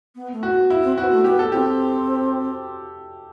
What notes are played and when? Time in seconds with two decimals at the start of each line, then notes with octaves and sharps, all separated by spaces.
0.15 B3
0.33 A3
0.43 F#4
0.52 B3
0.70 E4
0.83 C4
0.98 B3 F#4
1.11 A3
1.24 B3 G4
1.39 A4
1.52 C4 G4